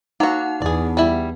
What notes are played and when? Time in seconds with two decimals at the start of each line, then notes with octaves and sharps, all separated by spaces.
0.20 A#3 D#4 F#4 F#5
0.62 E2 B3 G#4 D5
0.97 G3 E4